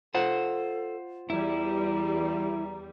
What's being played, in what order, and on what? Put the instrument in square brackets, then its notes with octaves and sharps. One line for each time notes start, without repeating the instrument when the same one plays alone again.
[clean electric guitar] F4 C5 F#5 [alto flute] A4
[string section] E2 G3 [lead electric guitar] E4 [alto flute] A#5